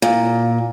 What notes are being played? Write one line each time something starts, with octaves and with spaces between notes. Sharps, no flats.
A#2